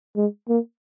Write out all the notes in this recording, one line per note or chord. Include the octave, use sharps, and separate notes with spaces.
G#3
A#3